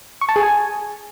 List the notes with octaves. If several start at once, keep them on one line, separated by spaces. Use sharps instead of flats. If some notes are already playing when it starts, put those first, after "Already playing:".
C#6
A5
G#4
G#5